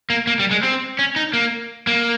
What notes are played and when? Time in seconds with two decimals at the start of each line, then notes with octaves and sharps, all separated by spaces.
0.10 A#3
0.27 A#3
0.39 G3
0.51 G#3
0.63 C4
0.99 C#4
1.16 D#4
1.33 A#3
1.87 A#3